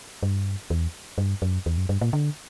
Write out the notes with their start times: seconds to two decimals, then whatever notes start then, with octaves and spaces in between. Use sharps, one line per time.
0.23 G2
0.70 E2
1.18 G2
1.42 F#2
1.66 E2
1.77 F#2
1.89 G2
2.01 A#2
2.13 D3